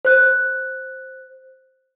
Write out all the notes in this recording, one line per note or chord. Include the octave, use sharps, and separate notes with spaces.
C5 F#6